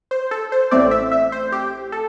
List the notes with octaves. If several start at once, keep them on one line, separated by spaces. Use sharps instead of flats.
C5
A4
C5
A1 A2 A3 C4 D5
E5
E5
C5
G4
A4